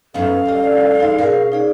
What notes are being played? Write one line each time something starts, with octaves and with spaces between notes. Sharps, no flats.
F#2 B3 C#4 D#4 A4 F5
D2 G3 D#5
E3 G#3 D#4 D5
B2 C#4 G#4 A#4
D#4 G#4 D5